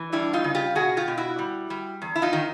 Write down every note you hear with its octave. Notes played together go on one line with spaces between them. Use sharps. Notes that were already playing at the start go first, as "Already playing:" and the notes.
Already playing: E3
G3 D4 E4
D#4 F4
C#3
F4 G4
B2 F#4 G#4
F4 G4
B2
E4 F#4
G3
G3
E2
E4
D#4 F4
D#3